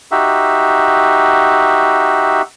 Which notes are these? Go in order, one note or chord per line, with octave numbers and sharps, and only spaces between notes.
D#4 F#4 G4 E5